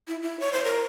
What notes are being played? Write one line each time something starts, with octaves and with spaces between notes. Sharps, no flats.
E4
E4
C#5
C5
A#4